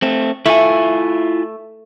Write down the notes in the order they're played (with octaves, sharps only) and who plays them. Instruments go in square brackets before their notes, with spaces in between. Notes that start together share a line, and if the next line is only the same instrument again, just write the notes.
[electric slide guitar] A3 C4
[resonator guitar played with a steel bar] A3 [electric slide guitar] E4 F4 G#5